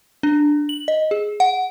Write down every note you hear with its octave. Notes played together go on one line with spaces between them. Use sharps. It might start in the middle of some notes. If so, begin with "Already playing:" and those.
D4
F#7
D#5
G#4
F#5